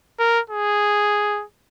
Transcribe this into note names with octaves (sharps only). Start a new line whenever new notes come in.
A#4
G#4